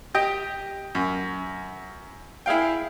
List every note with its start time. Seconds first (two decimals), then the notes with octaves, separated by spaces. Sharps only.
0.14 G4 D#5 G5
0.95 F#2
2.46 E4 G#4 F5 G5